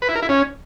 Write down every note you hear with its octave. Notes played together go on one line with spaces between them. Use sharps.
B4
E4
A#4
E4
C#4